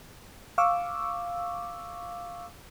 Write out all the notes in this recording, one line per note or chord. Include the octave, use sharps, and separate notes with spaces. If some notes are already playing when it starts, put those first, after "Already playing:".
F5 C#6 D6 E6